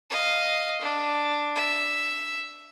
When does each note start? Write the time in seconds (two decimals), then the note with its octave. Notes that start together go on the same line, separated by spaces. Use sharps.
0.10 D#5 F5
0.81 D4
1.56 E5